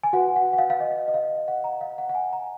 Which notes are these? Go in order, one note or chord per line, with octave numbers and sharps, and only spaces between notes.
G#5
F#4 B4 F#5
F#5
F#5
F5
F5
D#5
D#5
F5
F5
F#5
A#5
F5
F#5
F#5
G#5
A#5